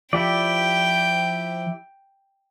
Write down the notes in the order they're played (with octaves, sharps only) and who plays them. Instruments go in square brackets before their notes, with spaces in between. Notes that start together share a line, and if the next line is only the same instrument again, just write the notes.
[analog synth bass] F3 [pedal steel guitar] E4 G4 D5 [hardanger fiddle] G5